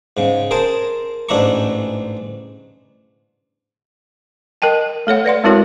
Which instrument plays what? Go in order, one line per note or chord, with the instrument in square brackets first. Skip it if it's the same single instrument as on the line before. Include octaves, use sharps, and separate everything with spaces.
[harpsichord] G#2 C#3
G#4 A#4 C5 A5
A1 G#2 D4 E5 A#5 C#6
[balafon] A#4 D#5 G5 A5
A3 A4 C#5 F#5
B4 D5 F#5 C6
G#3 C4 E4 F#4 A#4 C#5